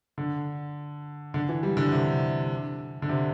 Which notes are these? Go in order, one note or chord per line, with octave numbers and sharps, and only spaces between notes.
D3
D3
E3
G3
D3
C3
D3
C3